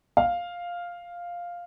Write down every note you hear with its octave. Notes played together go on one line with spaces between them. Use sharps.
F5